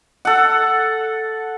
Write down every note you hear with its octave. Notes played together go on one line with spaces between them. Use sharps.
A4 F#5